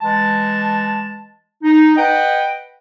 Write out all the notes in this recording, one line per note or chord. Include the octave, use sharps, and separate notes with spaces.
E3 G#3 A5
D#4
B4 D#5 F#5 G5